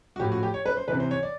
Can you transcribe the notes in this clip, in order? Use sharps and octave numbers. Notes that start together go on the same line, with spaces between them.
F#4
A2 F3 G4
F#4
G4
C#5
B4
C5
C3 E3 B4
C5
C#5
D5